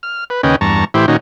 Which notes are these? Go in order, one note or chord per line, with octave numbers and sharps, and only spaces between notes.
F6
B4
D#2 C#3 C#4 B4 D#5 G5
E2 G2 A5 A#5 C#6
A2 E3 E4 G4 C5
A#2 D#3 C#4 D#4 F#4